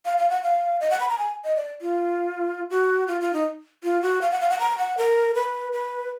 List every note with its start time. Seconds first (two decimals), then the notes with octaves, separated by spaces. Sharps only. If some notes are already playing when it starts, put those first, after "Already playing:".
0.05 F5
0.18 F5
0.30 F#5
0.43 F5
0.81 D#5
0.90 F#5
1.00 B5
1.09 A#5
1.18 G#5
1.44 D#5
1.56 D5
1.82 F4
2.70 F#4
3.08 F4
3.21 F4
3.33 D#4
3.84 F4
4.02 F#4
4.21 F5
4.31 F#5
4.41 F5
4.50 F#5
4.59 A#5
4.78 F#5
4.98 A#4
5.35 B4
5.73 B4